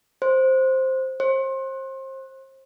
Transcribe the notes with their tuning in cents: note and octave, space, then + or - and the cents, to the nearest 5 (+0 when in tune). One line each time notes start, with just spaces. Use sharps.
C5 +5
C5 +30